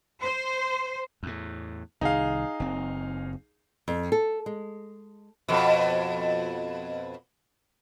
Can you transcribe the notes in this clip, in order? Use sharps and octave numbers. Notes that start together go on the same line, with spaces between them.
C5
E2 A2
C2 D#3 D#4 G#4 F5
F#1 C4
F2
A4
G#3
F2 B2